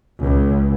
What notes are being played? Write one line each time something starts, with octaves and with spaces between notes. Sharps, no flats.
C#2